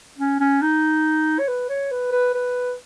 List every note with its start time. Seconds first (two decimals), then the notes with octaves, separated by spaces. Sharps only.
0.18 C#4
0.40 C#4
0.62 D#4
1.39 C#5
1.48 B4
1.69 C#5
1.91 B4
2.12 B4
2.34 B4